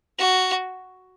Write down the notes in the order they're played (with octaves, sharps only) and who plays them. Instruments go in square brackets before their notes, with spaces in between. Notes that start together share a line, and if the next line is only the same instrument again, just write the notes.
[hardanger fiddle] F#4